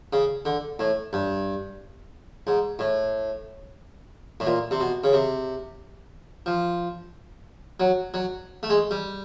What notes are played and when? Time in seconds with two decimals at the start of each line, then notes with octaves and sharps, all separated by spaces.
0.13 C#3
0.45 D3
0.79 A2
1.13 G2
2.47 G#2
2.79 A2
4.40 A2
4.47 A#2
4.71 C3
4.80 B2
5.04 C#3
5.13 C3
6.46 F3
7.80 F#3
8.14 F#3
8.63 A3
8.70 G#3
8.91 G3